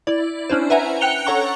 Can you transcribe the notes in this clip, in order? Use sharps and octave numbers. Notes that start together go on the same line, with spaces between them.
E4 D5
C#4 D4 E4 C5
B4 E5 F#5 G#5 A#5
G5 F#6 C#7 F7 G7
A4 C#5 F#5 A#5 C#6